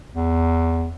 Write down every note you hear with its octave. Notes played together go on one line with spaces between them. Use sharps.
E2